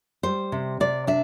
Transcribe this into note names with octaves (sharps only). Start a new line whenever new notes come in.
G3 C5
C3
C3 D5
D4 E5